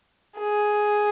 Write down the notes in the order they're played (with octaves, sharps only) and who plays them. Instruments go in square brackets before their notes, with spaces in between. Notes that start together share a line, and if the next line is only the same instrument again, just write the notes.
[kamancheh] G#4